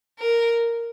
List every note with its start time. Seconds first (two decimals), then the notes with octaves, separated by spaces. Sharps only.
0.20 A#4